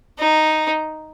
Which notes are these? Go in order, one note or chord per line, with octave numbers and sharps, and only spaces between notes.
D#4